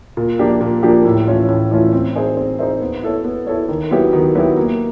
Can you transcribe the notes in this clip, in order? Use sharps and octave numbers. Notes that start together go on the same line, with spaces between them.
A#2
F3 A#3 D4 G4
A#2
F3 A#3 D4 G4
A2
E3 A3 C#4 F4
A2
E3 A3 C#4 F4
C4
D#4 G#4 C5 E5
C4
D#4 G#4 C5 E5
B3
E4 A4 C#5
B3
E4 A4 C#5
D#3
F#3 B3 E4 G4
D#3
F#3 B3 E4 G4
A#3